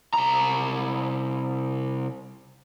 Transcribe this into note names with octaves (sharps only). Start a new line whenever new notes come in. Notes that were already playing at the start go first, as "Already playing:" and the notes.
C2 A#5